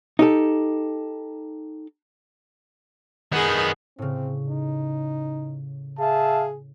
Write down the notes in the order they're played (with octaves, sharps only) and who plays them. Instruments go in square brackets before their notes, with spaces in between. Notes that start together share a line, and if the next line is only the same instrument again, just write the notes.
[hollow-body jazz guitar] D#4 G4 A4
[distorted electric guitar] D#3 B3 [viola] G#4 F#5
[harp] A2 C#3 [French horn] C4
[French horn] D#4
[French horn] G#4 [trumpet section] E5 F5 A5